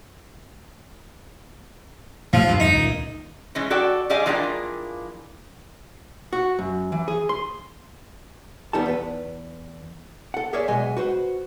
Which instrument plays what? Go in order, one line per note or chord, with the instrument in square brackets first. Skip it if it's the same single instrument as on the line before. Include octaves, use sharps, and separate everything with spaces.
[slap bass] A2 C3 G3 [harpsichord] F3
[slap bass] E2 G2 E3
[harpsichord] D#4
[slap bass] C#2 A#2 D#3
[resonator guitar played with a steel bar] E3 G#3 C#4
F#4 A4 D5 G5
G3 G#4 D5 D#5 F5 G#5
E3 F3 A#3 D4 G#4 G5
[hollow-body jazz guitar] F#4
F#2
E3
G#4
C6
D#2 G3 B3 D#4 A4 A5
E2 B4
A4 F#5
G4 G#4 A#4 C#5 D5 E5
B1 B2 G#3 D#5 E5 G#5
F#4 B4 C5